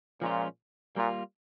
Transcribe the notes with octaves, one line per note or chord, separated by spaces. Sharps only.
A#2 F3 G#3 C#4 F4
A#2 G3 A#3 F4